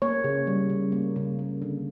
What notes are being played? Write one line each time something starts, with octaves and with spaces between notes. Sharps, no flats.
A#3 C#5
C#3
G3
C#3
A#3
C#3
A#3
D3